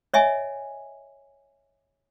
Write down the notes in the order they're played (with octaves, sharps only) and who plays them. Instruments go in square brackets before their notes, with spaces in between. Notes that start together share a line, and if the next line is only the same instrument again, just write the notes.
[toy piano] C#5 D#5 E5 G#5